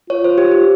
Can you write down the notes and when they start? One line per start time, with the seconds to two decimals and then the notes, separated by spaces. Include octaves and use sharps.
0.10 F4 C#5
0.24 C5
0.38 G4
0.52 G4